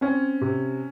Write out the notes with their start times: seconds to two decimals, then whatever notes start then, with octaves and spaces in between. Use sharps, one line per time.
0.01 C4 C#4
0.41 C3